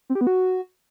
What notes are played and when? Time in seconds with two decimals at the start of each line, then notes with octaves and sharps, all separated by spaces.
0.10 C4
0.15 G4
0.21 B3
0.27 F#4